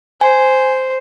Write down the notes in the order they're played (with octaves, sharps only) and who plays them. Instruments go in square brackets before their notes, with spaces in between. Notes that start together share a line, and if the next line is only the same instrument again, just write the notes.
[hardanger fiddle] C5 [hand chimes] G#5